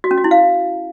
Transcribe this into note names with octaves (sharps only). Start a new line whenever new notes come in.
F#4
C#4
F#4
E4
F5